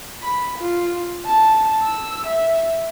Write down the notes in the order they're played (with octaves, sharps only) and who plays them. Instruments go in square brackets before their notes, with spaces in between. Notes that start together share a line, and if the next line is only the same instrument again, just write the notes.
[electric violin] B5
F4
A5
E6
E5